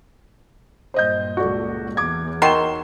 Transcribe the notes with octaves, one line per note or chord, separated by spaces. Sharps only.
G2 A#2 C5 D#5 G6
C#2 A#2 F#4 A4 D5
E2 D6 G#6
D#3 F#3 G5 C6 E7